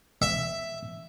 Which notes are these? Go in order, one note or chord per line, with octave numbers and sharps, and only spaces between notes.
E5